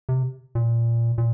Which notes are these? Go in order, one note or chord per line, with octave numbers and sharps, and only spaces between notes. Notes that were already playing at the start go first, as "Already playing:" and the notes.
C3
A#2
A#2